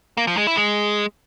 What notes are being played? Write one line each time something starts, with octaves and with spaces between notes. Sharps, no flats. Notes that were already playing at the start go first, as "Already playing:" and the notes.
A#3
F3
G#3
E4
G#3